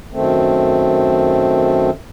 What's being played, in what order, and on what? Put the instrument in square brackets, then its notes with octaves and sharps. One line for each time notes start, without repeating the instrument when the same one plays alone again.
[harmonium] F#2 D#3 A3 C4